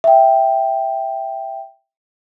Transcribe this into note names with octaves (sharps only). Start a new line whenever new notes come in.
E5 G5